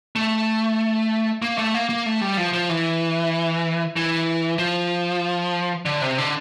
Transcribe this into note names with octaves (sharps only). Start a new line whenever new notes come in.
A3
A#3
A3
A#3
A#3
A3
G3
F3
F3
E3
E3
F3
D3
C3
D3